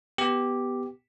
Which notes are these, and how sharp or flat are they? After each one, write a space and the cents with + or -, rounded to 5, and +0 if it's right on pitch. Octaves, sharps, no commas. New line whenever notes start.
B3 +0 G4 +0